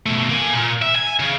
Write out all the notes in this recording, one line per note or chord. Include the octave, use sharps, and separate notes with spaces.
B2 A3
A#3 G#5
A#2
E5
G#5
C#3